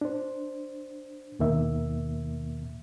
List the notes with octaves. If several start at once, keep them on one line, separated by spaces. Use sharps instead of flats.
D4 C5
D#2 B2 D#3 A#3 E5